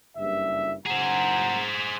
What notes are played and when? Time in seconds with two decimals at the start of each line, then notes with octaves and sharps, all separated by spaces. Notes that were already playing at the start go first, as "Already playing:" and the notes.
0.17 F#1 G2 E5
0.86 F#1 G#4 C5 F#5 A#5